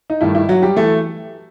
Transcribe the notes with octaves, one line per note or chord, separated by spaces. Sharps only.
D#4
G2 D#3 A3 E4
E4
F#3 F#4
G3 G4
E3 A3 A4